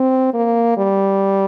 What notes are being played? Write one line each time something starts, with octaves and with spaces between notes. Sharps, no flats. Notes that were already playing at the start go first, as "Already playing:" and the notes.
Already playing: C4
A#3
G3